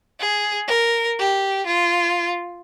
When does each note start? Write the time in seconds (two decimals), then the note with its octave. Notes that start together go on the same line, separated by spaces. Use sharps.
0.20 G#4
0.68 A#4
1.19 G4
1.66 F4